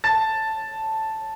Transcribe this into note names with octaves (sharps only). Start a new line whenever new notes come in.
A5 A6